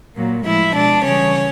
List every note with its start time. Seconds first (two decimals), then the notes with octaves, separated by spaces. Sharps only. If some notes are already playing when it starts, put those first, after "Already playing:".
0.16 A#2 F#3 A#3
0.45 A2 F3 G#3 E4 E5
0.75 B2 G#3 D4 D5
1.04 C#3 E3 G3 C#4 C#5